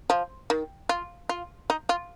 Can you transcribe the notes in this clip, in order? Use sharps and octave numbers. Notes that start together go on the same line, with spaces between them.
F3
D#3
F4
F4
D#4
F4